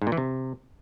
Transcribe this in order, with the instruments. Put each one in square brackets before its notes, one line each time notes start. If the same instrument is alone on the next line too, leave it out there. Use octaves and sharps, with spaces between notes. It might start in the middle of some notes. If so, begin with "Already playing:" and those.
[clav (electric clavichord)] G#2
A#2
E3
C3